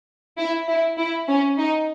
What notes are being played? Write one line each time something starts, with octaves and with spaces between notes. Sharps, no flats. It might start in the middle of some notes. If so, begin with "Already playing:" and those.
E4
E4
E4
C#4
D#4